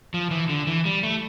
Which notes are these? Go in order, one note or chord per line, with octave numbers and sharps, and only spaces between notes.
F3
E3
D3
E3
G3
A3